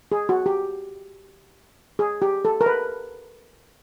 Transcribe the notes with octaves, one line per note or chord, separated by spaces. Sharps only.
G#4
F#4
G4
G#4
G4
A4
A#4
B4